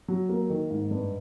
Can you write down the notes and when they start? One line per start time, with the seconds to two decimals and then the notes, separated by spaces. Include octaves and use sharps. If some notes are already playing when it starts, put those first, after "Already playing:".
0.08 F#3
0.29 A#3
0.50 D#3
0.70 G#2
0.91 G2